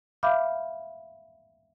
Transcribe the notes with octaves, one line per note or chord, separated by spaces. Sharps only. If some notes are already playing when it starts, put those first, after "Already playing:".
E5 F5 B5 D6 F6 G6